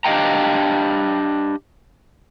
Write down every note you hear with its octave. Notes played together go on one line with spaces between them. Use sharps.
D4 G4 D#5 F5 G5 A#5